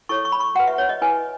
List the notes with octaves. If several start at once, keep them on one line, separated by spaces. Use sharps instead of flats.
E4 A4 C#5 C#6
C#6
B5
C#6
F#4 B4 F#5
E5
C#5
D#5
E4 B4 G#5